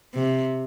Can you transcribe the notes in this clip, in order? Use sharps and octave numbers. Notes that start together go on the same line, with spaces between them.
C3